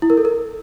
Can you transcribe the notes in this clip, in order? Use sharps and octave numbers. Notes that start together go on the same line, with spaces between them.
E4
A#4
A4
A#4